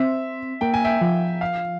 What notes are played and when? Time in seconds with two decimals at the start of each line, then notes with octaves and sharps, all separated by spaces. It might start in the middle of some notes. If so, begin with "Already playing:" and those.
Already playing: C4 E5
0.61 A#3 G5
0.74 G#5
0.85 E5 G5
1.01 F3
1.41 F5